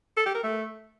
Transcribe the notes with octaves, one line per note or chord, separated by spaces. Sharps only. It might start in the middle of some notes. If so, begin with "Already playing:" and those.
A4
G4
A#4
A3